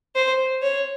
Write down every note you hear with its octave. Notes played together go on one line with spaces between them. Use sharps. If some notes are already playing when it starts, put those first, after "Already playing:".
C5
C#5